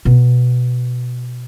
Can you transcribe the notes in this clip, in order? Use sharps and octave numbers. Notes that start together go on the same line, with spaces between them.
B2